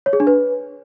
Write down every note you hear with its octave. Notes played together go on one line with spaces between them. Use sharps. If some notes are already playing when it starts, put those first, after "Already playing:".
C#5
G#4
D4
B4